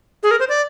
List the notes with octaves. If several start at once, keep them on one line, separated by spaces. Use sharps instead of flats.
G#4
A#4
C5
D5